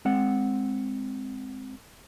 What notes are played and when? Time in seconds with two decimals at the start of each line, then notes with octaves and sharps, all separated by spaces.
0.05 G#3 C4 F#5